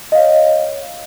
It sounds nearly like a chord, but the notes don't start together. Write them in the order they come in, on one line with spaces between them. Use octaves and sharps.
D#5 F5 C#5